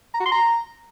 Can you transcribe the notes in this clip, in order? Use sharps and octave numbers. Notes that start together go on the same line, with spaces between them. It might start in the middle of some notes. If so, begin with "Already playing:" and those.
A#5
F#4
C6
A#5